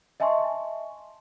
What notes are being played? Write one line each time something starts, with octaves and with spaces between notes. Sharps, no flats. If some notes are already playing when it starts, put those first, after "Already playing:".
D#5 E5 G#5 A5 C6 C#6